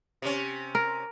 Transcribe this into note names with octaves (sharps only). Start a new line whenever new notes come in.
C3 C#4
A#4